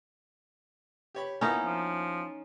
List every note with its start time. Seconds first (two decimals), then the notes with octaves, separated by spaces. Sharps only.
1.15 G4 C#5 B5
1.41 A#3 B3 C#4 D#4 E4
1.65 F3